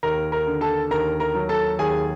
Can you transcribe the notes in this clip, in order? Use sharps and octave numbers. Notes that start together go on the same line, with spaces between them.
D#2 A#4 A#5
A#4 A#5
D3
A4 A5
D#2 A#4 A#5
A#4 A#5
F#3
A4 A5
D#2 G#4 G#5